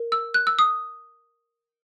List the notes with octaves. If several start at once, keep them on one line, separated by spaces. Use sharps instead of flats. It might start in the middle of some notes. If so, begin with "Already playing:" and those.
Already playing: A#4
E6
F#6
E6
D#6